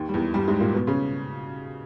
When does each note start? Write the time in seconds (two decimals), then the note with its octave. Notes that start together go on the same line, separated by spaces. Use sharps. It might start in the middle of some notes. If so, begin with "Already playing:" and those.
Already playing: D#2 D#3
0.09 G3
0.14 E2 E3
0.34 G2 G3
0.48 G#2 G#3
0.60 A#2 A#3
0.74 B2 B3
0.87 C#3 C#4